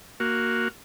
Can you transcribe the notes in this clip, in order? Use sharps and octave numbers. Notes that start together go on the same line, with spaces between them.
A#3 F#4